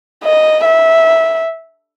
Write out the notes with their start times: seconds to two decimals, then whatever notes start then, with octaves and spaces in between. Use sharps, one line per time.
0.24 D#5
0.65 E5